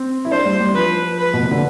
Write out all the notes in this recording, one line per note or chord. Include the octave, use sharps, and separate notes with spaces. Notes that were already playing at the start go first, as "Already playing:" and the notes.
Already playing: C4
E4
D4 C5
G3
G3
F3 B4
B4
B2
C3
D3